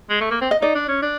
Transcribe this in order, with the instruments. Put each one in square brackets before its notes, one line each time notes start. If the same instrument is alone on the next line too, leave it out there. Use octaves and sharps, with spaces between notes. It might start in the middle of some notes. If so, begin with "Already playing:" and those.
[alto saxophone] G#3
A3
A#3
C4
[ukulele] D#5
[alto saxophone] D#4 [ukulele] D5
[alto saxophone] D4
C#4
D4